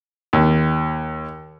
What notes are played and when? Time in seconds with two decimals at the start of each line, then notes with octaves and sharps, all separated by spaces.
0.33 D#2